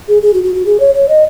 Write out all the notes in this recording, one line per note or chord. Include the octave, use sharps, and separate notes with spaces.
G#4
G#4
F#4
F#4
F#4
G#4
C#5
C#5
D#5